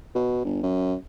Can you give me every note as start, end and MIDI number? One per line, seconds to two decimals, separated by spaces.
0.15 0.44 47
0.45 0.63 31
0.63 0.95 42